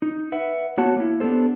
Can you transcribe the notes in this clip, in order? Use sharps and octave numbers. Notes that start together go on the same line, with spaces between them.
D#4
B4 E5 F#5
A#3 B3 F#4 C#5 F#5 A5
A#3 E4
B3 D4 G4 A4 C5